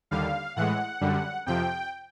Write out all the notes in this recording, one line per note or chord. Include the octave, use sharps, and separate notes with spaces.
D#2 D3 G3 F5
A2 E3 G#3 F#5
F#2 D3 G3
F2 C3 F3 G5